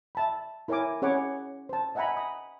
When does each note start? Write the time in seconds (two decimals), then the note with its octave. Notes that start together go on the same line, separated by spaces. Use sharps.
0.15 E5 A5 B5
0.68 E4 A#4 C#5 E5 G#5 D6
1.02 C#4 G#4 C#5 F#5 B5 D6
1.69 C5 A5
1.95 D#5 E5 F#5 G#5 A#5 B5
2.17 B5 D#6